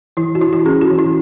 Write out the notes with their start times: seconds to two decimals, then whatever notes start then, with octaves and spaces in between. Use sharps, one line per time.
0.17 E3 E4
0.35 F#4
0.41 E3 E4
0.53 F#4
0.65 C#4 G#4
0.81 F#4
0.91 E3
0.99 E4